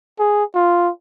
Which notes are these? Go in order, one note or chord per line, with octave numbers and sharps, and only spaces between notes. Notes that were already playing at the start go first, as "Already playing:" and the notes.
G#4
F4